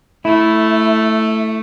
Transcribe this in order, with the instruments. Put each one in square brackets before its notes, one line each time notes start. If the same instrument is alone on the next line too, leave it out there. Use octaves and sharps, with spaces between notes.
[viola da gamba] A3 [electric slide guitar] E4